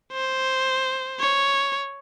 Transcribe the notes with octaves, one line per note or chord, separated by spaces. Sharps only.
C5
C#5